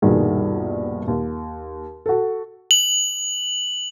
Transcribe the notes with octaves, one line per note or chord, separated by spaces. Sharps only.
D#1 A#1 G2 B2 D#3 G#4
D#2
F#4 A4
F#7